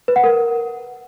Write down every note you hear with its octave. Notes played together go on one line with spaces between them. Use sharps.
B4
F#5
A#4